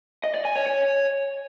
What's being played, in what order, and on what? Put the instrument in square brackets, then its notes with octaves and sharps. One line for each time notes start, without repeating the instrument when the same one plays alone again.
[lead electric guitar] D#5
D5
G#5
C#5
C#5